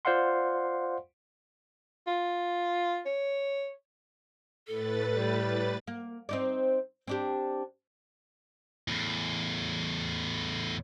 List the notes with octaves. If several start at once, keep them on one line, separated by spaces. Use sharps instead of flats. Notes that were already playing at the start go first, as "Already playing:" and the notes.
F4 C5 D5 F5 F#5 C6
F4
C#5
A2 A4 B4 A6
G3
A#3
C4 D#4 D5
C4 D4 G4
E2 A2